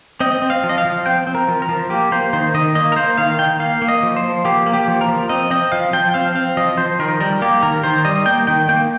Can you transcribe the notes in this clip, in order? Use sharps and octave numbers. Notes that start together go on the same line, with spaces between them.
C4 D#5
C4
F5
F3
D#5
F5
F3
C4 G5
C4
A#4
F3
A#4
F3
A#3 G4
A#3 C5
D#3 C5
D#3 D#5
A#3 D#5
A#4
A#3 C5
D#3 F5
D#3 G5
A#3 F5
A#3
D#5
F3
C5
F3
A#3 G4
A#3
G4
F3
A#4
F3
C4 D#5
C4 D#5
F3 F5
F3 G5
C4 F5
C4 F5
F3 D#5
F3 C5
D#3 A#4
G3 A#4
A#3 G4
D#3 A#4
D#3 C5
G3 D#5
A#3 G5
D#3 G5
A#3 G5